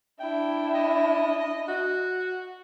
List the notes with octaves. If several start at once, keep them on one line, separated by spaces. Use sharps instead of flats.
D4 E4 G5
D#5
F#4